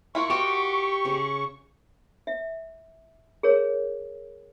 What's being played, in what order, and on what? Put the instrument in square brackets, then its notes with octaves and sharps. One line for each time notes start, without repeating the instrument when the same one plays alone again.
[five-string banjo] E4 F4 A#4 [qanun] B5 [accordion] C#6
[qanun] F#4 D#5 A5 [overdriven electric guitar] G4
[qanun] C#3
[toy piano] E5
G#4 A#4 C#5